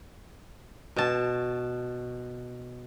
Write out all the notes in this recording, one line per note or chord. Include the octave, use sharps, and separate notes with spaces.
B2 A5